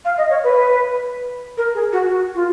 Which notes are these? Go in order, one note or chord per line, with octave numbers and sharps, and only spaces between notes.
F5
D#5
C#5
B4
A#4
G#4
F#4
F#4
F4